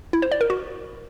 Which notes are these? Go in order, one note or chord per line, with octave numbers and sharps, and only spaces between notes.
E4
C5
D5
A#4
F#4